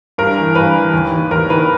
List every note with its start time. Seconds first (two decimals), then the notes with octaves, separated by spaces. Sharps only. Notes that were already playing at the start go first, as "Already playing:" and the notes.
0.18 G2 A#4
0.37 E3
0.55 G2 B4
0.75 E3
0.93 D#2
1.12 D#3
1.31 D#2 A#4
1.50 D#3 B4